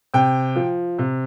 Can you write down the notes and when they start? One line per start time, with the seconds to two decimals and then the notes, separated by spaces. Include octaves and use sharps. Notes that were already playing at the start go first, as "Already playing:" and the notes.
0.14 C3 G5
0.56 F3
0.99 C3